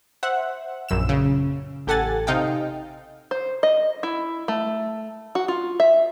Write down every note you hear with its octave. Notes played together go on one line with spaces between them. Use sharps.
C5 E5 F#5
A#1 F#2 E6 E7
C#3
A1 G4 A4 F#5 G#5 A6
C3 D#4 F5 G5
C5
D#5
E4
A3
F#4
F4
E5